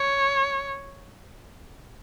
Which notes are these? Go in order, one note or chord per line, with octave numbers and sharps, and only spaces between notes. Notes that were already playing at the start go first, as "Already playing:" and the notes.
Already playing: C#5